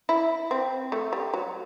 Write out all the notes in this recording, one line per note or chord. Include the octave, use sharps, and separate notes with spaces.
E4
C4
A3
G3
F#3